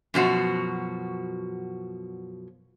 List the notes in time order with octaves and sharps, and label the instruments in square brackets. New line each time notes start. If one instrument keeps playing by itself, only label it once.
[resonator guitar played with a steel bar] F#2 B2 F3 F#4